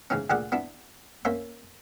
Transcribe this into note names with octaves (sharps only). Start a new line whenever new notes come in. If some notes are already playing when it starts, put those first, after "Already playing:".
G#2 C#3 E3 C#4
D2 A#2 D3 G#4 D5 F#5
B3 D4 E4
A#3 C#4 C5 C#5 E5